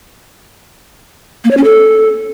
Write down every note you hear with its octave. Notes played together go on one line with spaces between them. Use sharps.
A#3
C#5
C#4
A4